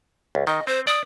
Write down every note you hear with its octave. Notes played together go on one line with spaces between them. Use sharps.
C#2
D#3 D#5
C4 C5
D5 D#6